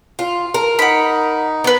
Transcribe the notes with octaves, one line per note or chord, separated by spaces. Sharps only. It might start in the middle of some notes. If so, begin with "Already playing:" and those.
F4
A#4
D#4 F#5 B5
B3 B4 D5